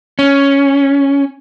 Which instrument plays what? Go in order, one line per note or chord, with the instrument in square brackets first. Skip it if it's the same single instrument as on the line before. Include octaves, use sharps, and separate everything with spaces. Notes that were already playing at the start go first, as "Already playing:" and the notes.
[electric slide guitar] C#4